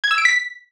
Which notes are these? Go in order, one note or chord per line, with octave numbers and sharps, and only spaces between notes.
G#6
E6
D7
B6